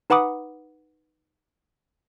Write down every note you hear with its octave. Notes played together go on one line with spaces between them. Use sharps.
D#4 B4 F#5 B5 D6 D#6